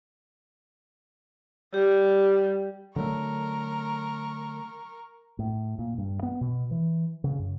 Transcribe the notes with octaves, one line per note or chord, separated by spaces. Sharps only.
G3 G4
D3 F#3 A3 A#4 C#6
A2
A#2
G2
B3
B2
E3
C#3
F#2